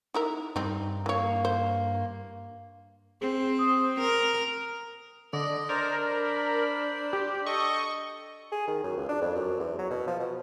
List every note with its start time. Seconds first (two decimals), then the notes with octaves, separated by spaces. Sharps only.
0.14 D#4 E4 A#4
0.56 G2 C4 D#4
1.06 E3 A#3 C#5
1.45 C5
3.21 C4 G#4
3.59 D#6
4.00 A#4
5.33 D3 D5 D#5
5.69 D4 A#4 C5 D5 A#5
6.09 C5 B5
7.13 G4
7.47 A4 D#5 C#6
8.52 G#4
8.67 D#3
8.83 F#2
8.97 C#2
9.09 D4
9.21 F2
9.35 F#2
9.60 E2
9.79 F#3
9.91 B2
10.07 F3
10.20 B2